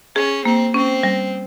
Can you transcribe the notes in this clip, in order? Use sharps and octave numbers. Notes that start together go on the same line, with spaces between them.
C#4 G#4
A#3 C4
C4 C#4
G3